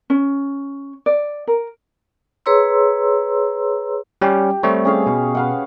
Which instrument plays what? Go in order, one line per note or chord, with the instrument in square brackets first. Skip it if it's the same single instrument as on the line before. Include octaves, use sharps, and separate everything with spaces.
[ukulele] C#4
D5
A#4
[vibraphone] G#4 B4 C#5 A#5 C6 E6
[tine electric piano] G3 C#4 [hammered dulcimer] G4
[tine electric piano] G3 A3 C4 [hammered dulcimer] C#5
[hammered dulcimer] C#4 G#4 F5
[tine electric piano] B2
[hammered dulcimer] B4 F5 F#5